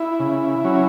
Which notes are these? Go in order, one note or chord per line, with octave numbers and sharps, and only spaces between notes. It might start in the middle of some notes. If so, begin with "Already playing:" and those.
Already playing: E4
C#3
F#3 C#4